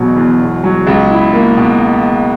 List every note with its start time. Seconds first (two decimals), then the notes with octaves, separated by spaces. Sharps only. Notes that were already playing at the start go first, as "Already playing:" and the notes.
Already playing: E1 B2 F#3
0.16 E2
0.39 E1
0.64 F#3
0.87 C#2
1.11 E4
1.33 A#3
1.57 B2